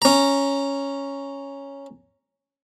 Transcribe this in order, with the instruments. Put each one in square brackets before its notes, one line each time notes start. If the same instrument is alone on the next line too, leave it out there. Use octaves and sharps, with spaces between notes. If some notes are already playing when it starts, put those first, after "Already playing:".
[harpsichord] C#4 A#5